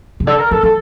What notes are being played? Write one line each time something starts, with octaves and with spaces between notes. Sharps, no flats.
C3
D3 A4
A#4
D3 A4
E3 A4